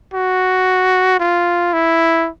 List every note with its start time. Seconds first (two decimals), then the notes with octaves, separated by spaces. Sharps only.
0.14 F#4
1.20 F4
1.73 E4